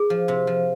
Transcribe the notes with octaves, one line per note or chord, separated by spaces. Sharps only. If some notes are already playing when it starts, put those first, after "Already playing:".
Already playing: G#4
F3
C3
F3